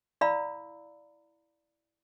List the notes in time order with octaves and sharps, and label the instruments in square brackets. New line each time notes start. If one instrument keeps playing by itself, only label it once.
[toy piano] E4 D5 F5 A#5 B5 E6